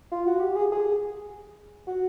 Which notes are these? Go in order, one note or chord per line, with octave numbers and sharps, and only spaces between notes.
F4
F#4
G4
G#4
G#4
F#4